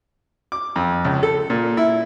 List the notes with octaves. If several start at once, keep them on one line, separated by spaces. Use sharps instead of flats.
D6
F2
C#2
A4
A#2
E4